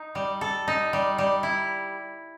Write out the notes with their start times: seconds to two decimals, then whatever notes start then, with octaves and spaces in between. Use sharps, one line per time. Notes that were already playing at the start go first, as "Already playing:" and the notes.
Already playing: D#4
0.15 G3
0.41 A4
0.68 D#4
0.93 G3
1.18 G3
1.43 E4